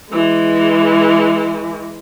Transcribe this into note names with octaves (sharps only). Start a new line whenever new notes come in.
E3 G#3